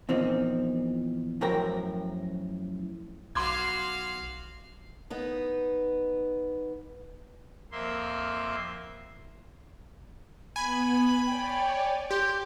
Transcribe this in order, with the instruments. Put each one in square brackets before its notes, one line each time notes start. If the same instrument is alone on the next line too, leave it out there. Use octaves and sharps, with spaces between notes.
[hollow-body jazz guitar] E2 A#2 F3 C4 D#4
F#2 A2 F3 A#4 G5 A#5
[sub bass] B1 [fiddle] F#4 F5 [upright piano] C6 D6 G#6
[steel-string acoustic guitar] B3 D#4 B4
[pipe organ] F2 A#3 E5 C6
[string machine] B3 [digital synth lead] G#5 [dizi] B5
[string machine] C#5 D5 [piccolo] G5
[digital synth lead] G4 [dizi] C6 [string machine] D6 [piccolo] G6